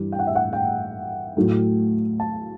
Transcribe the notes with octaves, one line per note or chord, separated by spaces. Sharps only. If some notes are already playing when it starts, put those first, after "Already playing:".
Already playing: G2 E3 G3
G5
F#5
E5
F#5
G5
A2 F#3 A3
A5